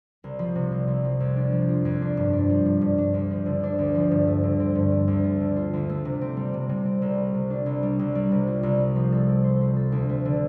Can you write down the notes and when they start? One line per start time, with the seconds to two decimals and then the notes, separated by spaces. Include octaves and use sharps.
0.24 C2
0.39 F3
0.55 C3
0.72 C2
0.88 C2
1.04 F3
1.20 F2
1.36 D4
1.52 F3
1.69 F4
1.85 F2
2.02 D4
2.17 G2
2.33 D4
2.49 F3
2.65 G2
2.81 G2
2.98 D4
3.14 D2
3.31 F3
3.46 D3
3.63 D4
3.79 D2
3.95 F3
4.11 G2
4.27 A3
4.43 D3
4.60 C4
4.75 G2
4.92 A3
5.08 D2
5.24 A3
5.40 D3
5.56 F4
5.73 D2
5.89 A3
6.05 C3
6.21 C4
6.37 G3
6.54 C3
6.69 C3
6.85 C4
7.02 C2
7.18 G3
7.34 C3
7.50 D4
7.66 C2
7.83 G3
7.99 C2
8.15 G3
8.32 C3
8.47 F4
8.63 C2
8.79 G3
8.96 F3
9.12 A4
9.29 C4
9.44 C5
9.61 F3
9.76 A4
9.92 D2
10.09 A3
10.25 D3